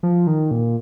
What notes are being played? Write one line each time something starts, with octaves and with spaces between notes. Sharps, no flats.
F3
D#3
A#2